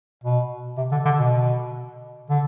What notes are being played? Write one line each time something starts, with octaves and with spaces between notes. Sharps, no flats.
B2
C3
D3
D3
B2
D3